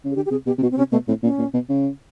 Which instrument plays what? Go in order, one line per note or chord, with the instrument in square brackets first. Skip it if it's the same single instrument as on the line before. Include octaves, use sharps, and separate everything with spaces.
[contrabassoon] C#3
[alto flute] G#4
[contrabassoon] D3 [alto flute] G4
[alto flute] G4
[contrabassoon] C3 [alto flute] G#4
[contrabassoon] B2 [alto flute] G4
[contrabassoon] C3
[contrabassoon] B2 [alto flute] F#4
[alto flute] C4
[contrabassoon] C3 [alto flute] C#4
[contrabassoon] B2 [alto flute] A3
[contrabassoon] A2 [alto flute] C4
[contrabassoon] A#2 [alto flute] C#4
[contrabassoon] A#2
B2
C#3